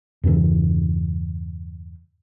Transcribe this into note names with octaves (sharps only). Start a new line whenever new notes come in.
E2 G2 C#3 E3